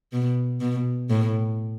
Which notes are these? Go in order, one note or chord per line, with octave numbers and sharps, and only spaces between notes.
B2
B2
A2